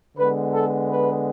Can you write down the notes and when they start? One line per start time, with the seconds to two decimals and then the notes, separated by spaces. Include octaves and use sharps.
0.17 D3 G#3 B3 B4
0.54 A4
0.91 B4